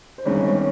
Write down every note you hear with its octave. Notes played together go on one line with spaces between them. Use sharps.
C5
G1 G2 D#3 G#3 C4 C#4 C#5